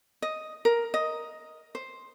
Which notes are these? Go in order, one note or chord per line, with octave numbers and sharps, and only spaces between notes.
D#5
A#4
D#5
C5